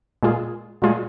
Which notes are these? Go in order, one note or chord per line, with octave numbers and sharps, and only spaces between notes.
A#2 G#3 F4 G#4
A#2 G#3 F4 G#4